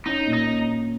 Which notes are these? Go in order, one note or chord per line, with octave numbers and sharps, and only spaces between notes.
C#4 D#4
A#2
D#4
C#4